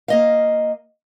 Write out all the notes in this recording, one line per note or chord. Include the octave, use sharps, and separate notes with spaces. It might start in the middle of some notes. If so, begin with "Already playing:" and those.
A#3 D#5 F5